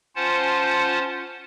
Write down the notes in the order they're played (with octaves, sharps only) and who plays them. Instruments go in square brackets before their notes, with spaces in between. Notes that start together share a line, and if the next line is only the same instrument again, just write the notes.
[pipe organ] C#4 F4 C5 F#5 A5